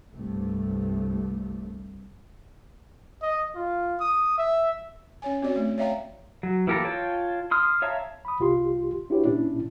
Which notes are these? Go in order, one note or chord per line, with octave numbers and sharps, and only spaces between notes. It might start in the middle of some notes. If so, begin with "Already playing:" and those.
C2 G2 A3
D#5
F4
D#6
E5
C#4 C#5 G#5
C4 F#4 C#5 D5
A3
C#5 D5 E5 F5 G5 A#5
F#3
E3 A#3 G4 A4 A#5
F4 C#5 G5 A5
C6 D#6 F6
C#5 E5 F5 A5 A#5
B5 D#6
C2 F4 G4 C6
D4 E4 F#4 G4 B4 C#5
A#2 C#4 D4 E4